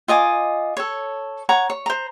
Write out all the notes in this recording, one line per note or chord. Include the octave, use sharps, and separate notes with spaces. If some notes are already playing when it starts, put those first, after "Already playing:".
F4 D#5 G#5 D6
A4 C#5
C#5 F#5 A#5 C#6
C#5
C5 A#5